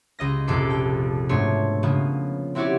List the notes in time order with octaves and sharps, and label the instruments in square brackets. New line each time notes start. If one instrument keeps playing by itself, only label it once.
[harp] C#2 D#5 A#6
A#1 F2 C3 A4 D6 C7
G5
G#2 B2 A3 D4 C#5 C6
C#3 F3 A#3 B3
C4 E4 F#4 G4 C#5 D5